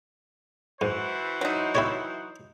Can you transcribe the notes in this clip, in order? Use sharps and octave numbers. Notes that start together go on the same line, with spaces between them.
G#2 E3 F#4 C5
F#3 D#4
E4 G4 C#5